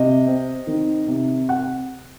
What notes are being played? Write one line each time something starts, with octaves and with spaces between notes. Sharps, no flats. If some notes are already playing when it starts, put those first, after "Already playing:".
Already playing: C3 D#5
C4
D#3
C3
F#5